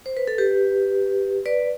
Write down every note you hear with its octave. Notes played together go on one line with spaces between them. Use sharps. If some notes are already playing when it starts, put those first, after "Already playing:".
C5
B4
A4
G4 B4
B4 D5